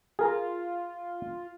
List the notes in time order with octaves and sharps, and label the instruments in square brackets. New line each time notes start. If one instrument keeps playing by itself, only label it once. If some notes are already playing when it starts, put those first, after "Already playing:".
[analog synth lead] F4 [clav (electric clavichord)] G#4 A#4 A#5